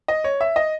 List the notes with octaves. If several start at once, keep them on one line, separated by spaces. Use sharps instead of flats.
D#5
C#5
E5
D#5